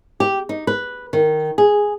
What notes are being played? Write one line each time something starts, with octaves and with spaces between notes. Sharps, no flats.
G4
D#4
B4
D#3
G#4